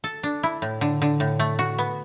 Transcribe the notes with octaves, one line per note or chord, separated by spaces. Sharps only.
A4
D4
E4
A2
D3
D3
A2
A3
F#4
B3